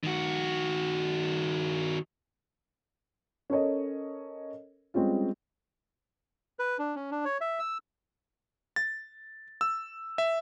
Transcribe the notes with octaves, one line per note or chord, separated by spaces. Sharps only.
D#3 F#4
C#4 A4 A#4 C#5 D#5
G3 G#3 C4 C#4 F4
B4
D4
C#4
D4
C#5
E5
E6
A6
E6
E5